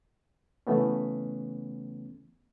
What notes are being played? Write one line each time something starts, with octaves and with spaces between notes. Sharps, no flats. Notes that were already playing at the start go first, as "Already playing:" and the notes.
C#3 E3 A3 B3 C#4